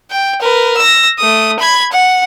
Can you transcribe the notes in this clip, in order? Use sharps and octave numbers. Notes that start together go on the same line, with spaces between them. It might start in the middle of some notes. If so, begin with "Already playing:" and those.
G5
A#4 B4
E6 A#6
A3 D#6
B5 G#6
F#5